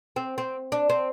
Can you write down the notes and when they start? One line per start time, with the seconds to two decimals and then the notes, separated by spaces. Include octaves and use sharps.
0.16 C4
0.38 C4
0.72 D4
0.90 C4